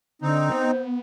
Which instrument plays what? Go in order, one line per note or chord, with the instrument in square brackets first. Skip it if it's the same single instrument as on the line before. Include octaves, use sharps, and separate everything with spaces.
[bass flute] D3 [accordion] C4 D#4
[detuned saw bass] B3 [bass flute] C5